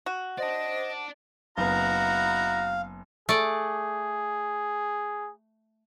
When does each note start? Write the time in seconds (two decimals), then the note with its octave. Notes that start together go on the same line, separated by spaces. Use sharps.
0.06 F#4
0.38 C5 D5 D#5 A5
1.58 F#1 B3 D#4 E4 F#4 F5 A#5
3.29 A3 G#4 D5